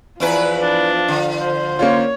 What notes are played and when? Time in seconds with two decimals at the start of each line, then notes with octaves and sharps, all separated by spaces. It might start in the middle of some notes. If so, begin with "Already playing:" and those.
0.20 E2 F3 E4 B4
0.61 D4
1.08 D3
1.41 C5
1.79 A#3 C#4 F4 C#5